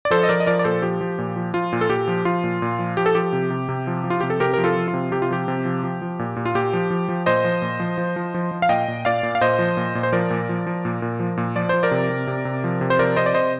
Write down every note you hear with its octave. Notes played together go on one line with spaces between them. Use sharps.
D5
F3 A4 C5
D#5
F3 A#4 D5
D#5
F3 A#4 D5
D5
A#2 A4 C5
F3 G4
F3
A#2
F3
F3 F4
A#2
A4
A#2 G4
F3
F3 F4
A#2
A#2
F3
F3 G4
A4
F3 G4
C3
C3
C3
F3
F3
F4
C3 G4
A4
C3 G4 A#4
F3 A#4
F4 A4
F3
F4
C3
C3 G4
F4
F3 G4
C3
F3
F3
F3
A#2
A#2
F4
A#2 G4
F3
F3
F3
A#2 C5 D#5
F3
A#2
F3
F3
F3
F3
F3
F5
A#2 D#5 G5
A#2
A#2 D5 F5
A#2
F5
A#2 C5 D#5
F3
A#2
A#2
C5
F3 A#4 D5
A#2
F3
F3
A#2
A#2
F3
A#2
F3 D5
F3 C5
A#4 D5
C3
C3
C3
C3
F3
C3
C5
F3 A#4 D5
C3 C5 D#5
D5
C3 C5 D#5